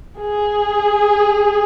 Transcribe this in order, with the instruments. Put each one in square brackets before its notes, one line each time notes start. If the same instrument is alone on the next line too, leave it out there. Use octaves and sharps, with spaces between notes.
[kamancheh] G#4